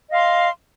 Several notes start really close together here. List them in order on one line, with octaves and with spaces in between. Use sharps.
D#5 F5 C6